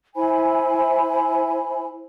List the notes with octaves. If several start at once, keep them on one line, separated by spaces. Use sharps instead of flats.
E4 C5 G#5 B5